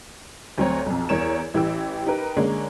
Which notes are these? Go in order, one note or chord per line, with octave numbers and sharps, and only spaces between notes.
D2 F#3 C4 C#5 A#5
B1 F2
E2 A#4 C#5 E7
A1 E3 G4 G5 E6
D#4 G4 A#4 B4
D3 G#3 A#3 C#4